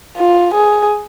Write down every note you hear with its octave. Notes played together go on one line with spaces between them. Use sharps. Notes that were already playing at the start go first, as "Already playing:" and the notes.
F4
G#4